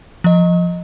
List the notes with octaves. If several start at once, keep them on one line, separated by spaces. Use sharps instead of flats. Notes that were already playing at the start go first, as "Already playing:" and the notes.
F3 D#5